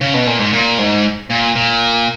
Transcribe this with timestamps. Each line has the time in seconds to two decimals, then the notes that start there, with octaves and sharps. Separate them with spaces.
0.01 C#3
0.14 B2
0.27 A#2
0.39 G#2
0.53 A#2
0.78 G#2
1.30 A#2
1.55 A#2